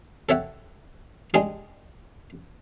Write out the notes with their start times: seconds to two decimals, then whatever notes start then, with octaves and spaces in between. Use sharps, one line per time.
0.29 A4 C#5 E5 F#5 G5
1.34 G#3 D4 G4 G#4